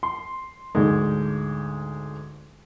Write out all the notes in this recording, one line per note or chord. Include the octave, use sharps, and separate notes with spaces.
C6
D2 G#2 G#3